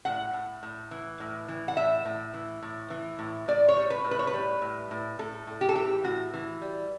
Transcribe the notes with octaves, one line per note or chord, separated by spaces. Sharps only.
A2 F#5
A2
A2
E3
A2
E3
F#5
A2 E5
A2
E3
A2
E3
A2
A2 D5
C#5
G3
B4
A2
B4
C#5
B4
G3
A2
A2
A2 A4
A2
G4
A4
E3 G4
A2 F#4
E3
G3